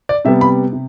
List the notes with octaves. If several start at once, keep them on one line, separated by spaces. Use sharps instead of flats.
D5
C3 G3 B3 E5
B5
C3